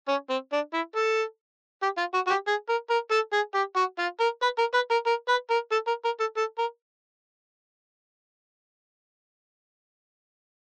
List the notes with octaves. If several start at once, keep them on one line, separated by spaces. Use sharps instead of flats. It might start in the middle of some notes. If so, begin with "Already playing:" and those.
C#4
C4
D4
E4
A4
G4
F4
F#4
F#4
G4
G#4
A#4
A#4
A4
G#4
G4
F#4
F4
A#4
B4
A#4
B4
A#4
A#4
B4
A#4
A4
A#4
A#4
A4
A4
A#4